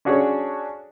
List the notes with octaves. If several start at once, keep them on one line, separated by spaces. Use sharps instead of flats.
C#4 D4 F#4 G#4 A4 C#5